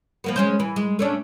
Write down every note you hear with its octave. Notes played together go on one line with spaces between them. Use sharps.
F3 A#3 B3
G#3 C#4 C5
E3
G#3
A3 C#4 D4